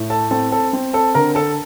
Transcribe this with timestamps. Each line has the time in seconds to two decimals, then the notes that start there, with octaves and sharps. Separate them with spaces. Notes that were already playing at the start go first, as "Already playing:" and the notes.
Already playing: A2
0.10 A4 A5
0.31 C4 A4 A5
0.52 A4 A5
0.73 C4
0.94 A4 A5
1.14 D3 A#4 A#5
1.35 A4 A5